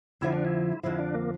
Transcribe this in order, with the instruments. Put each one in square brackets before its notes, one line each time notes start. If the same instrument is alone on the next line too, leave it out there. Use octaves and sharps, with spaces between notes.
[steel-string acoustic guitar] F2 D3 F3 [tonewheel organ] E4
[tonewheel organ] D4
E4
[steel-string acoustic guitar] F2 D3 F3 [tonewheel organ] E4
[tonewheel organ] D4
A#3